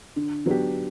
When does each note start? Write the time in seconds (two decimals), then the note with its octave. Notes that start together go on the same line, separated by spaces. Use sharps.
0.16 D3
0.46 F#3 B3 D4 G4